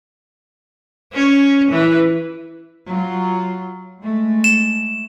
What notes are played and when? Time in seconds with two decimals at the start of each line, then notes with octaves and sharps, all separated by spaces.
1.13 C#4 C#5
1.71 E3 B4
2.88 F#3 F4
4.01 G#3 A3
4.44 E7